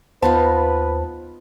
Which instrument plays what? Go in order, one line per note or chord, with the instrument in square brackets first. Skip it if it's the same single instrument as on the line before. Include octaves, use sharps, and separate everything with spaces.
[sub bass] D#2 [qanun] B3 D#4 F4 [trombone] B4 [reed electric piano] C5 A5